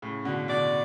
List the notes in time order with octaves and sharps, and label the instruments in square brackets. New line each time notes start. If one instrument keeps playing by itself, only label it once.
[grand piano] A2 C#3
B2 D3
[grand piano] B2 D3 [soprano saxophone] D5